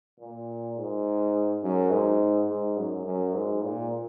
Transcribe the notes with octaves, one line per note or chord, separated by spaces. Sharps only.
A#2
G#2
F#2
G#2
G#2
F#2
F#2
G#2
A#2